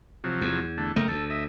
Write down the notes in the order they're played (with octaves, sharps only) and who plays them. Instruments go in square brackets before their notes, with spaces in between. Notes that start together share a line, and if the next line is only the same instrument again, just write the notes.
[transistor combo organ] C3 F3 F#3
[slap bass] E2
[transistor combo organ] D3 A3
[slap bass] F#1 A3 [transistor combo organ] A#4 D#5 G5
[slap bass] D2 [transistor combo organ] A4
[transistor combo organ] D#5 E5